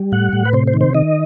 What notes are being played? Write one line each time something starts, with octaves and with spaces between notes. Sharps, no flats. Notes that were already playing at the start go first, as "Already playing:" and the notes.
Already playing: G3
A2 F#5
A2
B4
C3 C5
C5
D#3
C5
D#3 D#5